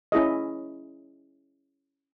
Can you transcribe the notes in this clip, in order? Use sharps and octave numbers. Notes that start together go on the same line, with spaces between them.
C#4 E4 G#4 D#5